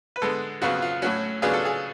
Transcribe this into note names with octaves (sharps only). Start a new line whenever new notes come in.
B4
D3 G#3 B3 A4
F2 C#3 F#3 B3 F4 F#4
F4
A2 F#3 C#4 F#4
C#3 F#3 B3 D4 F4 G#4
A4
G#4